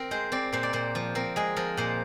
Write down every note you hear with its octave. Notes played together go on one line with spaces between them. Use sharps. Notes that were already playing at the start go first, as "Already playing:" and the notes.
Already playing: C4 A#4
G#3 C5
C4 D5
A#2 C5
D5
A#2 C5
F3
C4 A#4
G#3 G#4
F3 A#4
A#2 C5